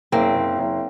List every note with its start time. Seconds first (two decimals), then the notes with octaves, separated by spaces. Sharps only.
0.12 F#1 A#3 C4
0.35 F#1
0.59 F#1